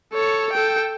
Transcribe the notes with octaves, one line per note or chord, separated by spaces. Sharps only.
A4 C#5
A4 G5